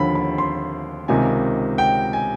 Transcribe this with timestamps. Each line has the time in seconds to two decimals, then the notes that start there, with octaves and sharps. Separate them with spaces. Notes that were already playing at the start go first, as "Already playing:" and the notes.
Already playing: D#2 D3 F3 B5
0.15 B5
0.38 C6
1.08 C#2 C3 D#3 G#5
1.78 G5
2.13 G#5